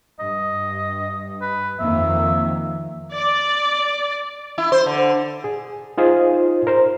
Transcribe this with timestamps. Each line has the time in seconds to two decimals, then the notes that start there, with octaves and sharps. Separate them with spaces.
0.20 G2 D#5
1.41 B4
1.80 F2 D#3 A#3 E5
3.15 D5
4.58 E4
4.72 C5
4.86 D3
5.44 G#4
5.98 D#4 F4 G#4 C5
6.67 A#4 C5